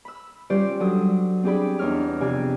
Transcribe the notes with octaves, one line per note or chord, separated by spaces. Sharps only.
B5 E6
G3 C#4 F4 G4 C5 D5
F#3 D4 A4 D#6
C4 D4 G4 G#4 D5 B5
E2 D4 D#4 C#5 F6
F2 C3 G4 D5 G#5 E6